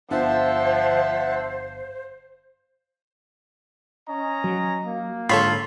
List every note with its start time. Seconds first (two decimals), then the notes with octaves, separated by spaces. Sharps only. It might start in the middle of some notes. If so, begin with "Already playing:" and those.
0.11 G1 F3 C5 E5 F#5 A5
4.09 C#4 D#5 A#5
4.44 F#3
4.85 A#3
5.29 G#2 D3 F4 A4 C#5 B5